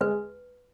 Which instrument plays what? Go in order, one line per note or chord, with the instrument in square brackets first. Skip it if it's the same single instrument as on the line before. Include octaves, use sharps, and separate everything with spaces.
[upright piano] G#3 [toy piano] B4